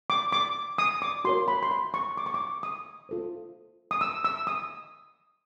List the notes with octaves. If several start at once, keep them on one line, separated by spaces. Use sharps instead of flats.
D6
D6
D#6
D6
F#4 A#4 C#5 C6
B5
C6
B5
C#6
D6
C#6
D6
D#6
F4 A4 C5
D#6
E6
E6
D#6